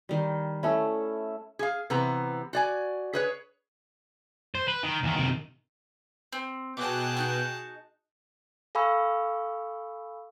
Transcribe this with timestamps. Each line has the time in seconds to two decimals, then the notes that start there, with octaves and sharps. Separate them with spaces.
0.09 D#3 G3
0.63 A3 C#4 E4 A4 E5
1.59 G#4 F5
1.90 C3 E3 B3 B4 A#5
2.53 F#4 D5 G#5
3.13 G#4 B4 C#5
4.55 C5
4.68 B4
4.84 D#3
5.03 E2 D#3
5.16 C3 D#3
6.32 C4
6.77 B2 G#4 G5 A5 D6 F#6
7.17 D4 D#4 F#4
8.75 A4 F5 G#5 B5 C#6 E6